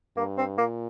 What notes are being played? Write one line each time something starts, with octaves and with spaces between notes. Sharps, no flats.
G2 A#3
C4
A#2 A#3